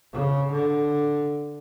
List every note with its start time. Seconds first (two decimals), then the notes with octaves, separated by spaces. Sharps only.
0.13 C#3
0.51 D3